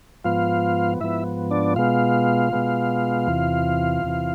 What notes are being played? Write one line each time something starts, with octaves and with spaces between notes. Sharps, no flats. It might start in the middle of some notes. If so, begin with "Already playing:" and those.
G#2 F3 B3 F4 F5
G#2 F3 B3 E4 E5
D4 D5
B2 G#3 B3 F4 F5
B2 G#3 B3
E2 C3 E3
E2 C3 E3